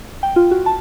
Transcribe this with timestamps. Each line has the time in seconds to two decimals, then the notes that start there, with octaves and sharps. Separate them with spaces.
0.23 G5
0.36 F4
0.51 F#4
0.66 A5